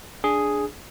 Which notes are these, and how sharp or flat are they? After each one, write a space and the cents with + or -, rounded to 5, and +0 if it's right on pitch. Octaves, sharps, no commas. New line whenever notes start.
D4 +0 G#4 +0